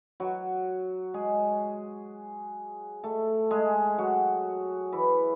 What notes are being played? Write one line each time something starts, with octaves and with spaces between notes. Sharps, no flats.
F#3 F#4
G#3 G#4
A3 A4
G#3 G#4
F#3 F#4
E3 E4